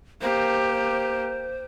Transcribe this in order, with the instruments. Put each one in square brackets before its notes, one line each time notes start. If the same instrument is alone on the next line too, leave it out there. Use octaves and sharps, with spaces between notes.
[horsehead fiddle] A#3 G4 [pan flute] C5